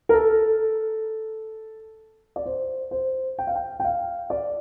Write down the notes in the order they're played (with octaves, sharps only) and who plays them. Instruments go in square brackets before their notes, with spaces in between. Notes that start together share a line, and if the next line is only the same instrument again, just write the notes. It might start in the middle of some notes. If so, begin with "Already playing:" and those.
[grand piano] A#4
A4
D5
C5
C5
G5
F5
G5
G5
F5
D5